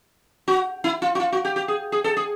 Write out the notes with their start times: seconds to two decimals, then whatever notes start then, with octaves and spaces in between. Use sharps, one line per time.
0.48 F#4
0.84 E4
1.02 F4
1.15 F#4
1.20 F4
1.32 F#4
1.45 G4
1.56 G4
1.68 G#4
1.92 G#4
2.04 A4
2.17 G#4